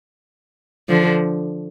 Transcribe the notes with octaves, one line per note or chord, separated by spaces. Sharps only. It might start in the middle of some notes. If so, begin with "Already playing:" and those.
D3 F3